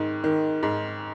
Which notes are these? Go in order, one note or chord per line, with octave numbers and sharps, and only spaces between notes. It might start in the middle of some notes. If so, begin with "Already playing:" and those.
Already playing: G#2 D#3
D#3
G#2